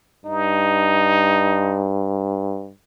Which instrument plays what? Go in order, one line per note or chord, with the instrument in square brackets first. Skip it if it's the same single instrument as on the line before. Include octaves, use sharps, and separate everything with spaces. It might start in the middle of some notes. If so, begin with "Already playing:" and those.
[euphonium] G2 [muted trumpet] D#4